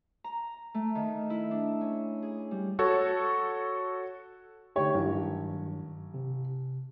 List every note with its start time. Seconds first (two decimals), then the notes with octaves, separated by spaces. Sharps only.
0.24 A#5
0.74 A3
0.95 D#3
1.30 E4
1.51 D4
1.81 C#4
2.22 G#4
2.51 G3
2.79 F#4 A4 C#5
4.76 D3 A3 D#4 G4 C#5
4.94 A1 G2 D#3 F#3
6.14 C3